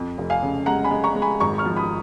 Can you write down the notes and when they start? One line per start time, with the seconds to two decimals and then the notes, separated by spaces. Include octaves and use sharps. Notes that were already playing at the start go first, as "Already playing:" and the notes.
Already playing: F2
0.18 F1
0.30 F5 G#5
0.43 C#3
0.66 G#3 F#5 A#5
0.84 G#5 B5
0.91 G#3
1.04 A#5 C#6
1.15 G#3
1.22 G#5 B5
1.40 G#1 A#5 C#6
1.58 C#6 F6
1.65 F3
1.76 B5 D#6